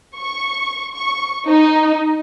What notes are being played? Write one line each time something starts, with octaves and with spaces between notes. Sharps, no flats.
C#6
C#6
D#4